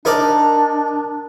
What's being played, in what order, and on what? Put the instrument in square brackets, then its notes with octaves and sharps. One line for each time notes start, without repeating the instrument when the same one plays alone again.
[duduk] D4 [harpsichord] D#4 A#4 D5